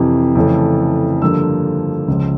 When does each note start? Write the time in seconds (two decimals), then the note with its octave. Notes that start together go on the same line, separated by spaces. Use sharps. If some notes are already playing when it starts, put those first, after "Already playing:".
Already playing: F2 C3 E3
0.35 F2 C#3 E3 A3
1.22 G2 D3 F3 A#3 E6
2.08 C#2 C#3 F3